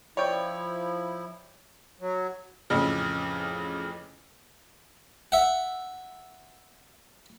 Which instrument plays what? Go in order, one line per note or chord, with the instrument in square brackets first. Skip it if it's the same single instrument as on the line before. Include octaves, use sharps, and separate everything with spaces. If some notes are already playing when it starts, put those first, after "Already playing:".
[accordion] F3 E4 [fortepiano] C#5 D5 G5
[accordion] F#3
[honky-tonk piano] A1 F2 C#3
[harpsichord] E5 F#5